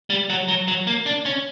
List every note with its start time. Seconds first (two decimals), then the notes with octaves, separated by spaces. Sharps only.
0.10 G3
0.30 F#3
0.48 F#3
0.68 F#3
0.87 A#3
1.06 D4
1.25 C#4